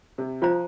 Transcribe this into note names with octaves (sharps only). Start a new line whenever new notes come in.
C3
F3 F4 C5 A#5